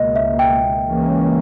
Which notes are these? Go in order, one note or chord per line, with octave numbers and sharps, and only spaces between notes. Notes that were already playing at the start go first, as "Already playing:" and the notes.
Already playing: C#2 B2 A#3 D#5
E5
G5
C#2 C#3 E3 A#3 C#4